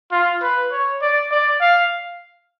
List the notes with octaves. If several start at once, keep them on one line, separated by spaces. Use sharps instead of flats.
F4
B4
C#5
D5
D5
F5